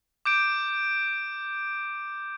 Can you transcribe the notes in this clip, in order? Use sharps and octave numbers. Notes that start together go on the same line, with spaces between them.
D6 G6 D7